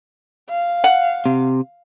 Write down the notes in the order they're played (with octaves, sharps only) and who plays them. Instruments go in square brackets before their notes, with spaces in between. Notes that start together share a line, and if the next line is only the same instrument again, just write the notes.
[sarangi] F5
[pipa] F#5
[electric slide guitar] C3